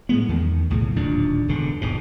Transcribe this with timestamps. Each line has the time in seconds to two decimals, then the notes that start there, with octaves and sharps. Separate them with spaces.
0.09 A2 G#3 B3
0.29 E2 D#3
0.70 B1 A2 C#3
0.96 D1 D#2 A#2 D4
1.48 E1 G2 D3
1.81 D#1 G#2 B2